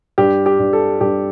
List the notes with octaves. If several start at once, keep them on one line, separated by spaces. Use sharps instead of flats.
G2 G4
G4
G2
A4
G2 G4